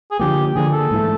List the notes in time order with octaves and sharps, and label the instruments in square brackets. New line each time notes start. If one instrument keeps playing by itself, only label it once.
[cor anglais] G#4
[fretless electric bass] D3 F3 A#3 [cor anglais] G4
[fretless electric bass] D3 F3 A#3 [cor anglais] G#4
[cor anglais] A4
[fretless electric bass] G#2 E3 A3